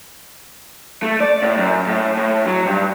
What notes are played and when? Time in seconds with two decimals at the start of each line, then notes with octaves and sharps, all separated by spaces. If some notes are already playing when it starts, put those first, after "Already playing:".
1.03 A3
1.20 D5
1.42 A2
1.57 F#2
1.87 A2
2.17 A2
2.46 F#3
2.66 G2